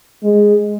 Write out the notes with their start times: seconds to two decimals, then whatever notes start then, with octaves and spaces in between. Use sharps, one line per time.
0.23 G#3